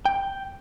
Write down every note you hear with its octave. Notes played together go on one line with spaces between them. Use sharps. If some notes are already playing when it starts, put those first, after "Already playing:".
G5